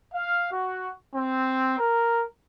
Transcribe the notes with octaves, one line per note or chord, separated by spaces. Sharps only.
F5
F#4
C4
A#4